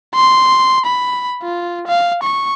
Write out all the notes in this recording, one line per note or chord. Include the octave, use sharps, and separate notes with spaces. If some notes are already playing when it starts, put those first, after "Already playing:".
C6
B5
F4
F5
C#6